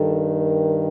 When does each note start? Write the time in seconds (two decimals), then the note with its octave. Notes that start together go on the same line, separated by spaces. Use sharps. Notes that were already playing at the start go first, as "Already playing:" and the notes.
Already playing: G2 D#3 A4
0.38 A#4